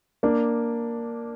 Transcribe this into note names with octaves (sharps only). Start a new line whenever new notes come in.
A#3 D4